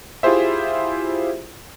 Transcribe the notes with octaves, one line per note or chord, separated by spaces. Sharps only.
E4 F4 G4 G#4 C5 E5